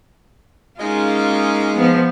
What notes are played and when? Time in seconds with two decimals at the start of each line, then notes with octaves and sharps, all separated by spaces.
0.80 G#3 A#3 C#4 D#4 F4
1.75 F3 B3